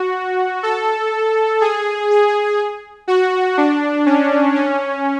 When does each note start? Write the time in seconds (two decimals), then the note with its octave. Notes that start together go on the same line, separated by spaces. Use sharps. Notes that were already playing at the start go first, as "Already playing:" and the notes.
Already playing: F#4
0.63 A4
1.61 G#4
2.10 G#4
3.08 F#4
3.58 D4
4.06 C#4
4.55 C#4